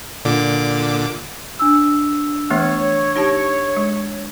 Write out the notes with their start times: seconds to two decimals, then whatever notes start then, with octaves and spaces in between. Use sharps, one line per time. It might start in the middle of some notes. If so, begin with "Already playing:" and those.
0.25 A#2 D3 D6
1.59 D4 E6
2.50 E3 A3 B3 C#5
3.16 D#4 G4 A5
3.77 G#3